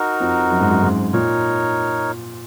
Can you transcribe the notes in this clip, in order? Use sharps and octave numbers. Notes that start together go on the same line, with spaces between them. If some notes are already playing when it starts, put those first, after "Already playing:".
Already playing: D#4 F#4 A#4
F2
F#2
G#2
F#2
G#2
A#2 D#4 A#4 C#5